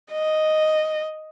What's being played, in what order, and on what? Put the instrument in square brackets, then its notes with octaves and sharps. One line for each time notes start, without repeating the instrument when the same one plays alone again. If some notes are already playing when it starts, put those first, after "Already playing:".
[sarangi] D#5